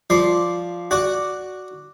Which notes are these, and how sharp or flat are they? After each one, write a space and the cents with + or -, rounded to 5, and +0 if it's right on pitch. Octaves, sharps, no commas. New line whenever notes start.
F3 +0 D5 +0 C6 +0
F#4 +0 D5 +0 F#5 +0